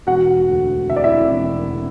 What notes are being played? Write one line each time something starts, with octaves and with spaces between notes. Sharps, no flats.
E1 F#4 F#5
D2
C3 E5
D5
E4 E5
E1
C3